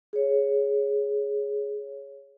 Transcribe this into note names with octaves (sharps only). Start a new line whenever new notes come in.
G#4 C#5